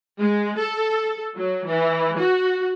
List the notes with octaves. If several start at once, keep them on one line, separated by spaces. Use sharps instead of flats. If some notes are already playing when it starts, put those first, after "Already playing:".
G#3
A4
F#3
E3
F#4